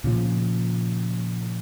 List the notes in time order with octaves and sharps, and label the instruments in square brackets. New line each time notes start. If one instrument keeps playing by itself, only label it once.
[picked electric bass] A#2 C#3 F3